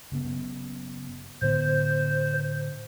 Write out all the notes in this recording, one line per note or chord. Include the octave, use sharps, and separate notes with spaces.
F#1 C#3 B3
A2 D3 B3 C5